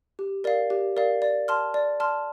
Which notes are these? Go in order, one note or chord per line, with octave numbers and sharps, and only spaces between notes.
G4
A#4 D5 F5
G4
A#4 D5 F5
D5
A5 C6 F6
D5
A5 C6 F6